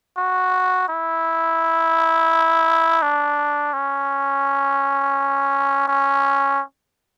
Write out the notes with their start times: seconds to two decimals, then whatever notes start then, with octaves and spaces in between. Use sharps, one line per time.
0.17 F#4
0.89 E4
3.03 D4
3.73 C#4
5.88 C#4